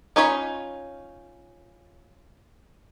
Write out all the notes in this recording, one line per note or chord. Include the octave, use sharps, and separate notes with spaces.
C#4 D#4 F4 C#5 B5